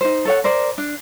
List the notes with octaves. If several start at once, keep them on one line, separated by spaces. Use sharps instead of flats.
D#4 C5
A4 C#5 F#5
A#4 C5 D5
D4